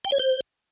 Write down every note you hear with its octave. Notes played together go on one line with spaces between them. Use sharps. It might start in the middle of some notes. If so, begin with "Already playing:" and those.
G5
C#5
C5